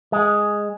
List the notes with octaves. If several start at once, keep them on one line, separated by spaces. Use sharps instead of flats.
G#3